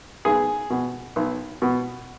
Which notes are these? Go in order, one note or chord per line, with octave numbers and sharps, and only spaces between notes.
B1 G#4
B2
B1
B2